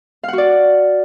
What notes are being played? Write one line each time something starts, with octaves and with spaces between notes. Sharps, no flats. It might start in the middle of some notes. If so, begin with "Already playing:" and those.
F#4 D5 F5 F#5